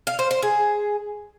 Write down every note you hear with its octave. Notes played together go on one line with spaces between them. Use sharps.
F5
C5
C5
G#4